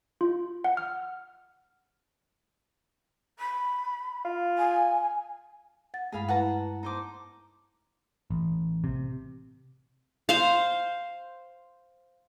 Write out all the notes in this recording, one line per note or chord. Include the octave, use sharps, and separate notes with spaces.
F4
F#5
F6
B5
F4
G#5
F#5 A6
G2 G#3 A3 G#4 F5 B5
E4 B4 F#5 A5 A#5
D#4 C5 D6
A1
C3
C5 F5